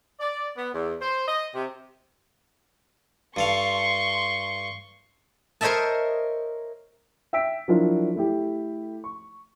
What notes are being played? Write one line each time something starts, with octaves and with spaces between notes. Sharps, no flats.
D5
B3
E2
C5
D#5
C3
G2 A4 F5 C6 C#6
A#4 C5 C#5 D#5 E5 A5
E5 G5 E6 B6 D7
F3 F#3 D4 E4 F4 A#4
A3 E4 G4
C#6